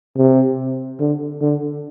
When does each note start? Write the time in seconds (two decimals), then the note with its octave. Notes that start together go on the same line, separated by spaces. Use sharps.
0.17 C3
1.00 D3
1.41 D3